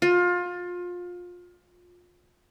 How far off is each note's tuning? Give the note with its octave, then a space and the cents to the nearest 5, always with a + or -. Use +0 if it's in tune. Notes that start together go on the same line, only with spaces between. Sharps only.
F4 +25